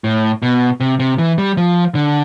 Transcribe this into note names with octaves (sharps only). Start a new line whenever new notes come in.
A2
B2
C3
C3
E3
G3
F3
D3